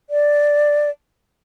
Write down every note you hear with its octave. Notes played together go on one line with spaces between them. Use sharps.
D5